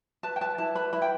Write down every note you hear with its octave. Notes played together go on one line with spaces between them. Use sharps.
B4 A5
G5
B4 A5
E4 A5
B4 B5
E4 B5
G5